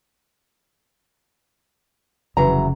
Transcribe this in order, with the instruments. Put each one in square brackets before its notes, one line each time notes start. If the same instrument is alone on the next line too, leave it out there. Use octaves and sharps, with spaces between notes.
[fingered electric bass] F1 C#3 [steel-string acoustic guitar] E3 F#3 A#5